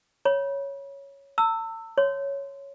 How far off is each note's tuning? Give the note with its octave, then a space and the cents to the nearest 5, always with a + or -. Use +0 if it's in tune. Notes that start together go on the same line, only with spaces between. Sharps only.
C#5 +0 B5 -35
A5 +45 E6 +0
C#5 +0 C6 -25